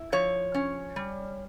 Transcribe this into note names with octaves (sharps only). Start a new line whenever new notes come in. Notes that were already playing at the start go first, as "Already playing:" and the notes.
Already playing: E4
F3 C#5
C#4
G3